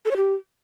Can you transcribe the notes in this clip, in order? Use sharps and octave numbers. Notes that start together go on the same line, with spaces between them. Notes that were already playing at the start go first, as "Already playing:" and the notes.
A4
C#5
G4